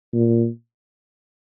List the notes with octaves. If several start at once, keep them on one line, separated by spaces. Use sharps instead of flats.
A#2